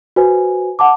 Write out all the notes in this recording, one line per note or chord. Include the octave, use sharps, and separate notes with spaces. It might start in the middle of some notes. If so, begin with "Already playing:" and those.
F#4 B4 C5 G#5
F#5 A5 D6